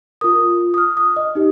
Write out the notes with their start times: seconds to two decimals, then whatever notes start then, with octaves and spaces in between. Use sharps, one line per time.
0.21 F4 A#4 D#6
0.74 D#6
0.78 F6
0.97 D#6
1.16 D#5
1.35 D#4 G4